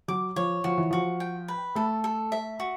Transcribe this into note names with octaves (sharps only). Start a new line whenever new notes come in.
F#3 D6
F3 C#5
F3 F#4
E3
F3 F#4
G5
B4
A3 A4
A4
E5
F#4